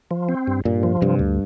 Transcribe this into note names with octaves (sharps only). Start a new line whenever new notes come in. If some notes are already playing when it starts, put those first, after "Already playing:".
F3
C4
G2
G2 A#2
F3
G2 C3
D2